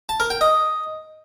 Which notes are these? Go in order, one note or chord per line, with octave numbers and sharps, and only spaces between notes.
A5
A#4
G5
D#5